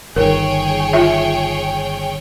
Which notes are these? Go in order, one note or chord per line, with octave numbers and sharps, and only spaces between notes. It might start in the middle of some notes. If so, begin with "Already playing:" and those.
G1 D#3 G#4 A#4 C#5 G5
F4 E5